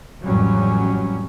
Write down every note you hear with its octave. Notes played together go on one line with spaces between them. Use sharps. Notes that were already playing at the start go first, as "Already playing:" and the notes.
A1 F2 F#3 G3 C#4